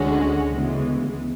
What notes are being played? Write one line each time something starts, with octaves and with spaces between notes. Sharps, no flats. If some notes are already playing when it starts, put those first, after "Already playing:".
Already playing: D2 D3 G#3 C#4 F#4
D2 C#3 E3 G#3 B3